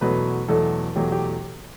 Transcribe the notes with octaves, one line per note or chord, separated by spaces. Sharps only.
E2 B2 F#3 A3 B4
E2 B2 F#3 A3 A4
E2 B2 F#3 A3 G4
G4